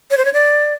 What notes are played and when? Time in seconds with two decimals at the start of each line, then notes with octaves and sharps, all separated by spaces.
0.11 C#5
0.17 C5
0.25 C#5
0.33 D5